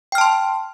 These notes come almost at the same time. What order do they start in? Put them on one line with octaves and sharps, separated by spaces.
G5 F6 A5 C6